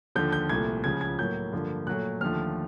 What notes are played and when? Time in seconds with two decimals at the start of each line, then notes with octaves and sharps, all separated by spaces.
0.16 D#2 D3 F3 G6
0.32 G6
0.49 C2 A#2 F3 A3 G#6
0.84 C#2 C#3 F3 G#6
1.01 G#6
1.18 A2 F#3 A#3 G6
1.53 G2 D3 F3 A#3
1.87 A#2 F#3 A3 F#6
2.21 D#2 D3 F3 A3 F6